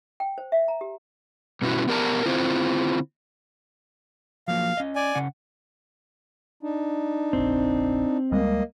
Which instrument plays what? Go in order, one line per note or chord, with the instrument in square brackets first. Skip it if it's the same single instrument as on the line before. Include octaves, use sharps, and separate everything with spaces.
[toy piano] G5
C5
E5
A#5
G4
[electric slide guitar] G2 B2 C#4 E4 F#4
B3 G4 A#4 D5 A5 A#5
D3 C4 E4 F4 C5
[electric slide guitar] F3 F#3 A#3 [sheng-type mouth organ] F5
[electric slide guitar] C#4 D#5
[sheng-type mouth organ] D5 G#5
[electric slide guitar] C#3 C#4 F#5
[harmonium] D4 D#4
[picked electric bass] F1 A#1 [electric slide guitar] C4
[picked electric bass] C#2 G3 G#3 [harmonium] A#3 D#5